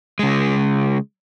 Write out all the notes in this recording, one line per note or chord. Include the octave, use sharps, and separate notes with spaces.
C#3 G#3